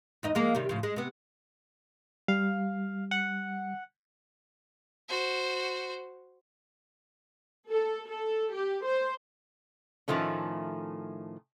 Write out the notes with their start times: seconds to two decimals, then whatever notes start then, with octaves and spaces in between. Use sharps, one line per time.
0.23 E2 D#4 D#5
0.35 F3 G#3 A#3
0.55 C3 D#3 G3
0.69 A2 C#3 F3
0.83 G#3
0.96 C3 B3
2.28 G3 F5
3.11 F#5
5.09 F#4 C5
7.70 A4
8.08 A4
8.54 G4
8.85 C5
10.08 A2 D#3 F3 A3 C#4